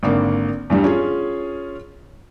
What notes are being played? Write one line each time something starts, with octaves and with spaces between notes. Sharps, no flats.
G#1 D3 A#3
E2 G2 G3
C#4 F4 G#4